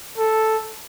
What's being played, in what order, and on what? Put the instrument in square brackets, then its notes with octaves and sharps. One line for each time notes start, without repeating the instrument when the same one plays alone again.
[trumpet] A4